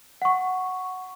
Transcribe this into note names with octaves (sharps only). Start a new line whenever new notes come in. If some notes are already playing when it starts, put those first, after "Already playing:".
F#5 C#6